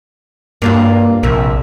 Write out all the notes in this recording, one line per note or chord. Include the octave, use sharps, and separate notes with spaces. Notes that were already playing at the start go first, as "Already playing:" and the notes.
G2 A#3 D4 F4
A#1 C3 A#4 E5